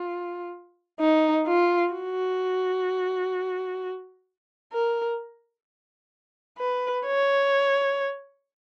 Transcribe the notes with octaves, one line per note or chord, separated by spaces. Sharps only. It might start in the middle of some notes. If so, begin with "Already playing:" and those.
Already playing: F4
D#4
F4
F#4
A#4
B4
C#5